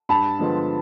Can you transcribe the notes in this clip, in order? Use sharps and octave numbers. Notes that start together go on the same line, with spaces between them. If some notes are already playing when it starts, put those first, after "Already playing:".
G2 A5 B5
D3 F3 G#3 B3